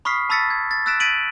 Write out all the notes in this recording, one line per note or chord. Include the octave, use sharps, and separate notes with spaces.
B5 C#6 D#6 F6 B6 C7
A5 B5 E6 A6 B6 C#7
G#6
A6
E6 F#6 A6 B6 D7 E7
G#6 A6 B6 D7 D#7 F#7